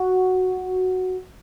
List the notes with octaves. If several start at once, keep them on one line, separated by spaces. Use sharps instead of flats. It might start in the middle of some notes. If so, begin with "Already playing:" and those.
Already playing: F#4